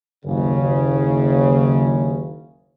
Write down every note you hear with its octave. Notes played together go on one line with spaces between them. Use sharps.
F#1 D#2 C#3